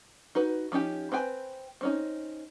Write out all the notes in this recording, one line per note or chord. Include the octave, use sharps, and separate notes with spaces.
D#4 F#4 B4
F3 C#4 D#4 G4
C4 B4 G5 G#5
C4 C#4 D#4